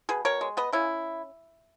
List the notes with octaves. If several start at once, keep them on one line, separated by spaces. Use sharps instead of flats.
B2 G#4 B4
B2 A#4 C#5
G#3
B3 B4 D#5
C#3 C#4 E4